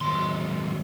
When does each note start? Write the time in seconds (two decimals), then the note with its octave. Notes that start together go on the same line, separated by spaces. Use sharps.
0.01 D#2 F#3 G#3 C6